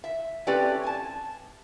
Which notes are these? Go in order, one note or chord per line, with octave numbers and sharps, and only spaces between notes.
E5
A3 C4 C#4 G4 B4 D5
G#5 A5